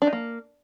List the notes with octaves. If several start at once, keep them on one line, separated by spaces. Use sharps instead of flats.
D4
D#4
A#3